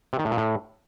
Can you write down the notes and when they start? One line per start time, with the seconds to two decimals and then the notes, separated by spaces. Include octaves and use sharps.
0.13 C3
0.19 D#3
0.25 A2
0.31 A#2
0.37 A2